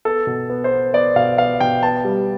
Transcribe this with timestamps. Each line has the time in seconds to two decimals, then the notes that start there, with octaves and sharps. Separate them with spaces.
0.05 B3 A4
0.27 B2
0.50 B3
0.64 C5
0.72 B3
0.93 B3 D5
1.16 B2 F5
1.38 B3 F5
1.60 B2 G5
1.83 B3 A5
2.05 G3